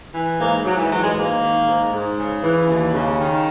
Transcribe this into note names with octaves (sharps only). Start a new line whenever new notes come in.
E3
G#2 A#3
G#2 F#3
E3
E3 F#3
G#3
G#2 A#3
D#3
G#2
G#2
C#3
E3
D#2
C#3
D#3